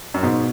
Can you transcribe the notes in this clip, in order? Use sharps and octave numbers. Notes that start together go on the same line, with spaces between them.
F#2
G#2 B2